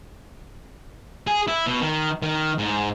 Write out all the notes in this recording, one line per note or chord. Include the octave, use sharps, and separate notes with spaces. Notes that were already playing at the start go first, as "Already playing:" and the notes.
G#4
E4
B2 B3
D#3
D#3
G#2